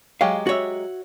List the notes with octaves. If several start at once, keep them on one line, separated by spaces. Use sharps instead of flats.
F#3 G#3 G4 F5
F#4 C#5 E5